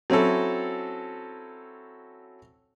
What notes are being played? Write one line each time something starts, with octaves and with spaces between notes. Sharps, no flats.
F#3 C4 C#4 E4 A4